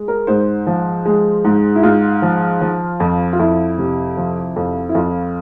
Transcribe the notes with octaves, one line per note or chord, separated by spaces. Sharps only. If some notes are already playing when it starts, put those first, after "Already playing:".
Already playing: G#3
A#4
G#2 C5
F3
G#3
G#2
E4
G#2 F4
F3
F3
F2
F4
F2 E4
C3
F3
F2
E4
F2 F4